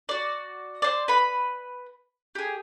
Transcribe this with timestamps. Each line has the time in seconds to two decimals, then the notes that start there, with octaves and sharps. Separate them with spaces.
0.09 F#4 D5
0.82 C5 D5
1.08 B4 B5
2.35 G4 G#4